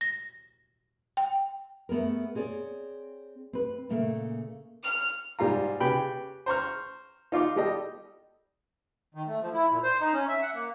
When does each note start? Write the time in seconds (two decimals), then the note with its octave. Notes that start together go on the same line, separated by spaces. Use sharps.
0.01 A#6
1.17 G5
1.89 A3 B3 G#4 A#4
2.35 C4 G#4 C#5 D5
3.53 C4 B4
3.89 A#2 C#3 A3 A#3
4.84 F6
5.39 G#2 G3 F4 F5 A#5
5.80 C#3 G4 B4 G5 B5
6.46 C5 A#5 C#6 F6
7.32 D#4 F4 D6
7.56 G3 G4 A4 D#5
9.15 D#3
9.27 A3
9.41 F3
9.54 E4
9.71 A#2
9.83 C5
10.01 D#4
10.13 C#4
10.28 E5
10.42 F#5
10.55 A#3